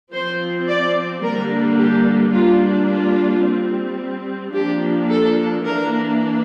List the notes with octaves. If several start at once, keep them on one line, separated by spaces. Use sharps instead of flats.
F3 C4 C5
D5
D3 G3 A#3 D4 A#4
G4
G3 A#3 D4 F4
F4
G3 C4
F3 A#3 D4 G4
A4
E3 A#3 D4 A#4